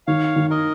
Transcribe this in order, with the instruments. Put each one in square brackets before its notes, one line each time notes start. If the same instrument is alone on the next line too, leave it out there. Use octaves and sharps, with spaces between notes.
[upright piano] D#3 [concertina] C#5 F5
[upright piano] D#3
[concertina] A#4 D#5